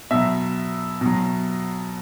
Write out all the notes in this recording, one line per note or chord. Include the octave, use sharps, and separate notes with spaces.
B2 F#3 E5
B2 F#3